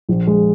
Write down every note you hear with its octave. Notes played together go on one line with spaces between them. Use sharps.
A#1
G#3